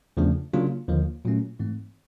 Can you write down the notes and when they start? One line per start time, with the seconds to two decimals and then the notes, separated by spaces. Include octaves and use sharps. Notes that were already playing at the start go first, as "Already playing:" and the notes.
0.17 E2 C#3 F3 A3 D4
0.53 C#3 F#3 A#3 D4 F4
0.88 D#2 D3 F3 A#3
1.25 A#2 F#3 A3 C#4
1.59 G#2 E3 A3 C4